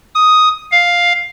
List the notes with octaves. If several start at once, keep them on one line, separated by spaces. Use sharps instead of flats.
D#6
F5